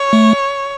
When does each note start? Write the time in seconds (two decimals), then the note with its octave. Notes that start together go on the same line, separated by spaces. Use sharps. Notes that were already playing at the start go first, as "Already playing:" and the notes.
Already playing: C#5
0.13 A3